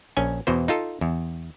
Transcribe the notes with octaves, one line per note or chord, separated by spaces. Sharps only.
A#1 C#4 G#5
E2 B2 E3 C5
D#4 F4 A4
E2